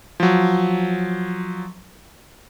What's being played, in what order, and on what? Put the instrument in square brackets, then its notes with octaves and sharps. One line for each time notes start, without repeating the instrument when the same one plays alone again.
[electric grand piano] F3 F#3